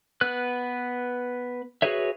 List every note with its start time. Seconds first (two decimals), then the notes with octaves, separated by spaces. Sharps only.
0.21 B3 B4 F#6
1.82 F#4 G#4 B4 C#5 E5